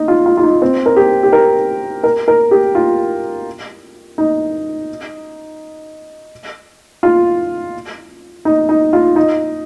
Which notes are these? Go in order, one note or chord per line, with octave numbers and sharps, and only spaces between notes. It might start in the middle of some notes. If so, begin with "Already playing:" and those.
Already playing: D#4
F4
F4
F4
D#4
C4
A#4
G4
G4
A#4
A#4
A#4
G4
F4
D#4
F4
D#4
D#4
F4
D#4